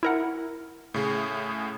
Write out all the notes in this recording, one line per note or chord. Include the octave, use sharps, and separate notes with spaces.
E4 A#4 F#5
A2 C#3 G#4